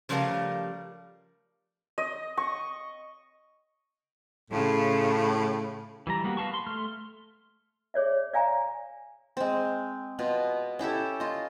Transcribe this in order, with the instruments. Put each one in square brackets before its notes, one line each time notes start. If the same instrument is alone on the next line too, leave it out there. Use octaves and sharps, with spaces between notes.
[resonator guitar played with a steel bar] C#3 F3 G3 A3 A#4 F5
[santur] D#5
C#6
[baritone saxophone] A2 [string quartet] C#3 F4
[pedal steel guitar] E3 G3 A#5
G3 A#3 B3 F#4
B4 F5 A5 C#6
C6
A3 C6 F6
[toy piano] G#4 C#5 D5 E5
D5 F5 G#5 A#5
[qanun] G#3 C4
B2 F4
C#4 E4 G4 A4
F4 D#5